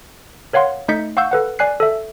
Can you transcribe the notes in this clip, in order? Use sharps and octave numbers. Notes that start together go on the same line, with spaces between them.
A#4 C#5 F5 F#5 C6
A3 D#4 D#5 G6 B6 C#7
F5 F#5 C#6 E6 G6
A4 B4 F#5
D5 G#5 F#6 C7
A4 E5